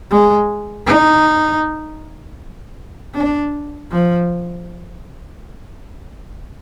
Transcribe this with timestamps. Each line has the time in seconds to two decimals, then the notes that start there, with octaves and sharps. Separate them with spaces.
0.10 G#3
0.87 D#4
3.14 D4
3.91 F3